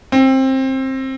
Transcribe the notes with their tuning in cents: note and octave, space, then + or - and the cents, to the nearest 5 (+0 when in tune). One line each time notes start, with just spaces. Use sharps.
C4 +20